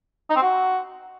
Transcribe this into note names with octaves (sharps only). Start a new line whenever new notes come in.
D#4
C4
F#4